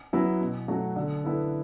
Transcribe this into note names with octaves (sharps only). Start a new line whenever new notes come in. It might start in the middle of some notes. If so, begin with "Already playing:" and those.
F#3 B3 E4
B2
F#3 A3 F#4
D3
B3 E4 A4